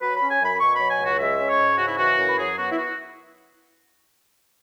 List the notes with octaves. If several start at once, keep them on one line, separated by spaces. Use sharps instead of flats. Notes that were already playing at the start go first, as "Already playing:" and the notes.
F#3 B4
C#4 B5
G#5
F#2 B5
B2 C#6
F#3 B5
G#5
C#2
F#4
G#3 E5
C#4
C#5
G#2
C#3 F#4
E4
E3 F#4
F#2
B4
F#3 G#4
B3 F#4
E4
F#4